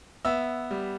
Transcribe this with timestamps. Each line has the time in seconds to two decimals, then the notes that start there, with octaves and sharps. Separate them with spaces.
0.25 B3 E5 E6
0.71 G3